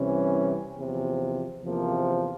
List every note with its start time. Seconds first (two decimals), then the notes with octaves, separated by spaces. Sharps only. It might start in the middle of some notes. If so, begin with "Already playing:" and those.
Already playing: C2 C3 E3 C#4
0.76 E2 C3 F3
1.64 E2 C3 F3 A#3